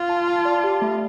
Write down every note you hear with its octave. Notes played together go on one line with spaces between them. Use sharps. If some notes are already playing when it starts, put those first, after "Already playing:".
Already playing: F4 F5
A5
A5
D5
G4
A3